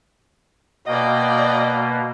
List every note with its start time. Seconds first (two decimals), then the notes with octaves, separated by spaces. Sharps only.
0.87 B2 A#3 D5 D#5 G5